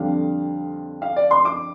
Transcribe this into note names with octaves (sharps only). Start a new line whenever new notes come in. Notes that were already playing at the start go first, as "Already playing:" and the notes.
Already playing: F2 D3 G3 D4 F5
F5
D5
C6
D6